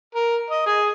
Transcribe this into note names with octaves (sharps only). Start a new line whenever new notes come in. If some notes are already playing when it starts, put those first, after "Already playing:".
A#4
D#5
G#4